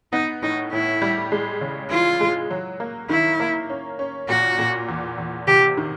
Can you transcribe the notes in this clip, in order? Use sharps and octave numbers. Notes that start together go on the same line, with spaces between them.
B3 D#4
A2 D#4
A2 E4
G3
G#3
C#3
E3 F4
G#3
F#3
A#3
D#3 E4
A#3
C#4
C#4
A#2 F#4
A#2
E2
E2
C3 G4
D#3